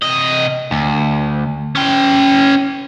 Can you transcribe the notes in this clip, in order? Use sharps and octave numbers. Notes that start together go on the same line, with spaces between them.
C3 D#5
D2
C#4 G5